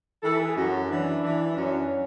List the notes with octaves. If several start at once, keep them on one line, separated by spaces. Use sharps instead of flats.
E3 A4
G#4
F#2 F#4
E3 D4
E3
F#2 C#4